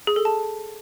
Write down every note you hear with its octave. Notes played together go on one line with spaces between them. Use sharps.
G#4
A4
A5